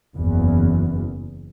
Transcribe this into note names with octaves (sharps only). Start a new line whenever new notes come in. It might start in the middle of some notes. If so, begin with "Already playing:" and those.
F#1 E2